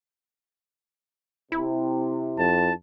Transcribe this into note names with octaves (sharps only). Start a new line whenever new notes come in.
C3 E4
F2 A5